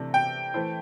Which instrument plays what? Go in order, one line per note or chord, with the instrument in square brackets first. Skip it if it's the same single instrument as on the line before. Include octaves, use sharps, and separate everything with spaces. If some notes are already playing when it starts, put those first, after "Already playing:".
Already playing: [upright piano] C3 E3 A3 D4
[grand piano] G5
[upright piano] E3 A3 E4 C5